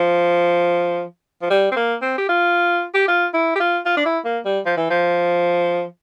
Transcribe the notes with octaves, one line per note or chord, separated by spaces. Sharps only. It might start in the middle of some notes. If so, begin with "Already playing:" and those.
Already playing: F3
F3
G3
C4
A#3
C4
G4
F4
G4
F4
E4
G4
F4
F4
D4
E4
A#3
G3
F3
E3
F3